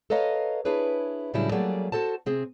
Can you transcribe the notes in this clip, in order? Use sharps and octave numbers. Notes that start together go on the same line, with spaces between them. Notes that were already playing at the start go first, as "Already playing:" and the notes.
A4 B4 C#5 D#5 F5 A#5
D4 E4 G#4 B4 C#5
A2 C#3 F#3 G3 D4 E4
F#3 G3 A3 A#3 G#4 D5
F#4 A4 C5 A5
C3 C4 G#4